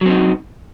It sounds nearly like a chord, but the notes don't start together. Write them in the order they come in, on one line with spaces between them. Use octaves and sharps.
F#3 C4 D#4